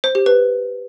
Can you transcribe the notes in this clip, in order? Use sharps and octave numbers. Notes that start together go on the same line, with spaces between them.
C5
G4
B4